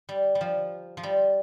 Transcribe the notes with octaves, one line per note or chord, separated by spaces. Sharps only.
G3
G3
F3
F3
G3